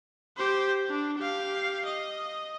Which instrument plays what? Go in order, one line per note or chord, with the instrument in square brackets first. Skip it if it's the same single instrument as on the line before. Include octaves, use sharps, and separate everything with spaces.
[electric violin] G4 C5
D4
G4 F5
D#5